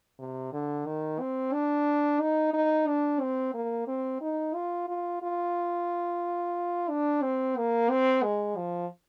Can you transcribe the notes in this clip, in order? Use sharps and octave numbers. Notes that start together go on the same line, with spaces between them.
C3
D3
D#3
C4
D4
D#4
D#4
D4
C4
A#3
C4
D#4
F4
F4
F4
D4
C4
A#3
C4
G#3
F3